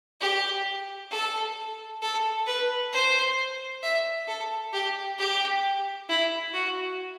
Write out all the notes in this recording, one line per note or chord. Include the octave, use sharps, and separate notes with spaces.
G4
A4
A4
B4
C5
E5
A4
G4
G4
E4
F#4